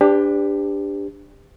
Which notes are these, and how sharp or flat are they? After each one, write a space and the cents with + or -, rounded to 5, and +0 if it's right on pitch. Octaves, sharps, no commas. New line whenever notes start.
D4 +0 G4 +20 B4 +45